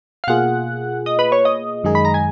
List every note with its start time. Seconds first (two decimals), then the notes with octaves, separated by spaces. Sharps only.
0.24 F5
0.28 B2 A#3 F4 G#4 F#5
1.06 D#5
1.19 B4
1.32 C#5
1.45 D#5
1.84 F#2 D#3 G#3 D#4 G#4
1.95 B5
2.05 A#5
2.14 G#5